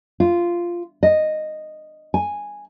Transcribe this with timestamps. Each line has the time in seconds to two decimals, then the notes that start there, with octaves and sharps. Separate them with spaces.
0.20 F4
1.03 D#5
2.14 G#5